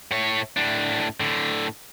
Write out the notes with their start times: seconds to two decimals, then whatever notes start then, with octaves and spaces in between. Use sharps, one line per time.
0.11 A2 C#5
0.57 A2 D4
1.20 A2 D3